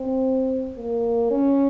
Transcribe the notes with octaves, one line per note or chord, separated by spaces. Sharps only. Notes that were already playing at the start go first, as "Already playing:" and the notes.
Already playing: C4
A#3
C#4